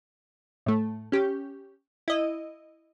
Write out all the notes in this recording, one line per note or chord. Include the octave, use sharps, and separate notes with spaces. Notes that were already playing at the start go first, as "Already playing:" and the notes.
A2 A3
C#4 G4
E4 D#5